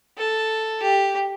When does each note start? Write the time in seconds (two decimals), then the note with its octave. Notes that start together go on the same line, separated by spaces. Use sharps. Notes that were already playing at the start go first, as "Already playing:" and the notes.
0.17 A4
0.82 G4